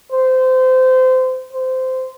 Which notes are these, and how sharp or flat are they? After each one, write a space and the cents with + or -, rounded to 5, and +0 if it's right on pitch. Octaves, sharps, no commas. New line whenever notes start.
C5 -25
C5 -15